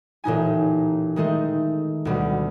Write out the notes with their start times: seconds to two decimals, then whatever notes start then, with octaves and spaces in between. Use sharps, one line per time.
0.24 A1 A#2 D#4 G#5
1.16 D#3 G#3 A3 D#4
2.05 D2 B2 G3